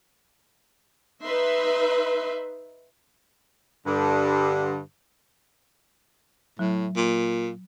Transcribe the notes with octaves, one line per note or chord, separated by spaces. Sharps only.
D#4 B4 E5 C6
G2 D3
A2 F#3
A#2